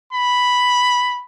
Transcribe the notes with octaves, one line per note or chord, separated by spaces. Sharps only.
B5